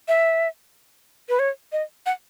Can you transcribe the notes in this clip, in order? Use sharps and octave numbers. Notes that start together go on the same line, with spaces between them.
E5
B4
C#5
D#5
F#5